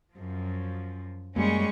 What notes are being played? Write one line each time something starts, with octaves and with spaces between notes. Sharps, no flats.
F#2 F3
F#2 G3 G#3 A#3 C#4 C#6